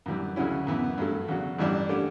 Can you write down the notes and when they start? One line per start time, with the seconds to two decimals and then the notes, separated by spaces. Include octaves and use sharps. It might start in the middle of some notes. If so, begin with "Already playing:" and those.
0.06 F#2 E3 G3
0.36 D2 C#3 F#3 C#4 E4
0.67 F#2 E3 B3
0.98 G2 F#3 A3
1.29 E2 C#3 F#3
1.58 A1 G2 E3 G3 D4
1.89 D3 A3 C#4 G4